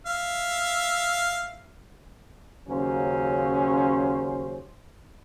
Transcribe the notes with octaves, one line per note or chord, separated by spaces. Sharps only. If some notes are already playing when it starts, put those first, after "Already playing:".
E5 F5
D#2 C#3 F#3 C#4 C5